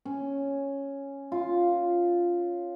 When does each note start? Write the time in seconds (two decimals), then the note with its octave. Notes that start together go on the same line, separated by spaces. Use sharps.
0.05 C#4
1.32 F4